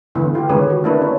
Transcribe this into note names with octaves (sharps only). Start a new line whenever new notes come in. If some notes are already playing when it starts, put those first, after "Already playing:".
D3 E3 A3 B3 E4
F4 G4
D3 D#3 G#3 C#4 G#4 B4
F#4
A3 A#3 D4 E4 B4
C#4